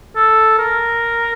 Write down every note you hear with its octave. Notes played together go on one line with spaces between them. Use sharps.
A4
A#4